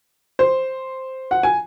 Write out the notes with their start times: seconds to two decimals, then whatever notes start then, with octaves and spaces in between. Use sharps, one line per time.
0.39 C5
1.31 F#5
1.43 G#5